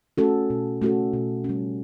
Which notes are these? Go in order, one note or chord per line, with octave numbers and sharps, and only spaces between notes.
A3 C#4 F#4 A4
B2
A3 C#4 F#4 A4
B2
G3 C#4